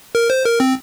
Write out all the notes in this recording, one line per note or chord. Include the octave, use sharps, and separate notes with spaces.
A#4
C5
A#4
C4